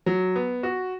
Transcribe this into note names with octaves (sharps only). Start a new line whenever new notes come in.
F#3
B3
F#4